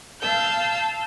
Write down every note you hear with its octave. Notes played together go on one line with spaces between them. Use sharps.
F5 A5 E6 G6